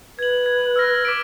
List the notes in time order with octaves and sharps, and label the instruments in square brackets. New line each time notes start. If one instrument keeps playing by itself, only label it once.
[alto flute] B4 [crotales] G#6 F#7
[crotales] G#6
E6 F6 A#6
D6 B6 D7